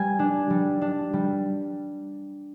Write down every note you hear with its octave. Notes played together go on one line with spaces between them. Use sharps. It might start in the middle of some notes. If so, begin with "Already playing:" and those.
Already playing: G3 G#5
D4
G3
D4
G3